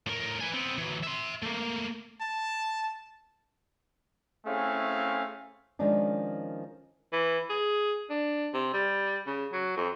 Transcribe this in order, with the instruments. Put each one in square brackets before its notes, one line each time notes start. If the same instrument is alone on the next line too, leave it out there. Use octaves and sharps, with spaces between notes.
[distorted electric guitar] A2 A#4
B4 G#5
B3 C4
E3 F#3
E5 C6
A3 A#3
[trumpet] A5
[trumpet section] A3 C4 C#4 E4 G#4 F5
[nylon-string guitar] D#3 F3 G#3 C#4 D4
[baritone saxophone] E3
G#4
D4
C3
G3
C#3
F#3
F2